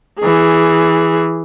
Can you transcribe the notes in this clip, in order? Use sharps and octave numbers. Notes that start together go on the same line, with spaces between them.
E3 G#4